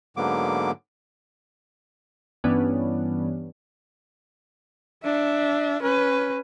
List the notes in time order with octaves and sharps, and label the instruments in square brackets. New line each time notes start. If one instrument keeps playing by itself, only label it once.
[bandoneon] G#2 D3 F#3 A#3 B3 D6
[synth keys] G2 E3 G3 B3 C#4 D4
[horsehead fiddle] D4 E5
C#4 B4